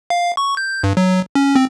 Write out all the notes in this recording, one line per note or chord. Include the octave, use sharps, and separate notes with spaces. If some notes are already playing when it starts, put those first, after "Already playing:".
F5
C#6
G6
G2
F#3
C#4
C4